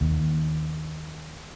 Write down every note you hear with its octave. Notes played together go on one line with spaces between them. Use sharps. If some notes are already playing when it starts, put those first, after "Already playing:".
D#2